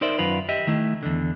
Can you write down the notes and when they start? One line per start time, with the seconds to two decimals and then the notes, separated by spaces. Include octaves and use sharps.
0.01 D#4 A#4 C5 D5 E5
0.19 F#2 D#3 F4 B4
0.49 G4 D#5 E5
0.67 D#3 A3 E4
1.03 E2 D3